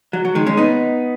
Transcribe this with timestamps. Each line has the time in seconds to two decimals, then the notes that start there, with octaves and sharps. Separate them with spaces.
0.13 F#3
0.25 F#3
0.35 D#3 G#3
0.47 G#3 C#4
0.57 B3 D#4